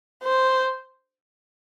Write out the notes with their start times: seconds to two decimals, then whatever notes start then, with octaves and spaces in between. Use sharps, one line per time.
0.24 C5